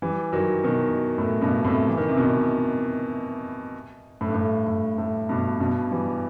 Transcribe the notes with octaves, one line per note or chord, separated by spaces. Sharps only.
E3 G3
D#3 F#3
B2 D#3
A2
G2 B2
A2 C3
E3
D#3
C3
B2 D#3
A2
G2
A2
A2
A2
G2 B2
G2 B2
E3 G3